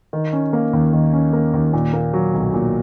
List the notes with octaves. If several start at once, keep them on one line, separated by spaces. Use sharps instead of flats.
D#3
C#4
A#3
D#2
D#3
C#4
A#3
D#2
A#2
A#3
F#3
B1
A#2